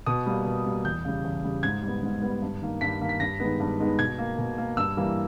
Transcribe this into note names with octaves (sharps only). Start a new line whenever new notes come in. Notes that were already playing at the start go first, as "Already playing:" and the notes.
B2 D#6
G3 A#3
B2
G3 A#3
E2 G6
C#3 G3
E2
C#3 G3
G#2 G#6
G3 B3
G#2
G3 B3
G2
D#3 A#3
G2 B6
D#3 A#3
B6
G2 A#6
D#3 G#3 B3
G2
D#3 G#3 B3
B2 G#6
A#3
B2
A#3
G2 E6
E3 G3 A#3